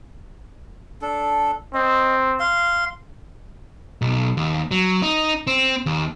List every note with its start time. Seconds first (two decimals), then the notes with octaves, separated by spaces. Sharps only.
1.02 D4 A4
1.74 C4 D#5
2.39 F5 C6
4.02 B1
4.37 D#2
4.71 F#3
5.02 D#4
5.47 C4
5.86 D#2